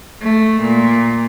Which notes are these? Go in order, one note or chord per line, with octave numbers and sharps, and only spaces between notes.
A3
A#2